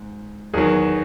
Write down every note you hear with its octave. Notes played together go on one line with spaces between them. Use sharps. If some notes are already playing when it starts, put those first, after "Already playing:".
Already playing: G#2
E2 D#3 F#3 G#4